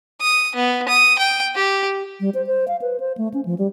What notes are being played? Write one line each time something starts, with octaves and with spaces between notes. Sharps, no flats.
D#6
B3
D#6
G5
G4
G3
C5
C5
F5
B4
C5
A3
C#4
F3
G3